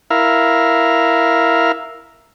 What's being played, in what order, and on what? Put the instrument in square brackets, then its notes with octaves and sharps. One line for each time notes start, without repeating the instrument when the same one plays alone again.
[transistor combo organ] E4 A#4 F5